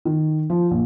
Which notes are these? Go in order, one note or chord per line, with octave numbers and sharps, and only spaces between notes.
D#3
F3
A#1